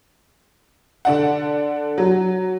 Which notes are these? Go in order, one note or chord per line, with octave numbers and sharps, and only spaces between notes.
D3 D4 F#5
F#3